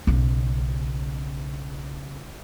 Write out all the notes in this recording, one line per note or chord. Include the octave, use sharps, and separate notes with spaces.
B1 C#3